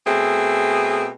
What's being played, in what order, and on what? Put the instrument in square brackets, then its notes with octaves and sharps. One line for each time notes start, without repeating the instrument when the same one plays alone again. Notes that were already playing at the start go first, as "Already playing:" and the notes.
[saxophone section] B2 A3 C4 G#4